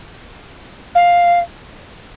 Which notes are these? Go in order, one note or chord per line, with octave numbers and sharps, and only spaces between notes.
F5